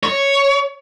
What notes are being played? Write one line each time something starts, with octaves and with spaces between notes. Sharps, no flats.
C#5